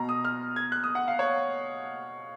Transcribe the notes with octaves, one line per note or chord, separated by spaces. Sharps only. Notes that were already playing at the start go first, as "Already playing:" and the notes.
Already playing: B2 A#5
D#6
F6
G#6
F#6
D#6
F#5
F5
C#5